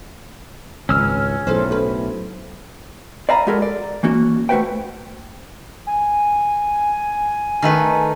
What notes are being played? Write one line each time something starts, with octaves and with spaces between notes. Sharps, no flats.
G#1 C#2 C#4 E6 F6
B1 A2 A4 B4 C5
D2 B4
D5 E5 F5 G#5 A#5 B5
G#3 F#4 G4 A4 A#4
D5
E3 A#3 C#4 F#4
A3 F#4 G4 B4 C5 G5
G#5
D#3 A3 B4